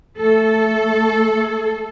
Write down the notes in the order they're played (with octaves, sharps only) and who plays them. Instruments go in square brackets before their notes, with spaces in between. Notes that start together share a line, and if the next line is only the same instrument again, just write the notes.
[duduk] A3 [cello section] A4